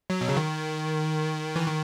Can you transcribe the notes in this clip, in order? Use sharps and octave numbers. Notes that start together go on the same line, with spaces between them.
F#3
B2
C#3
D#3
E3
D#3